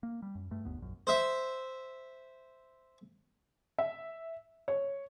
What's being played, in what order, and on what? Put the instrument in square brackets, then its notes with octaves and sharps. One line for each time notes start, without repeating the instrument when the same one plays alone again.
[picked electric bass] A#3
G3
F#2
G2 A3
G1 D#2 B3
A#1 F#2
[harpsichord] C5 E5
[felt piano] E5
C#5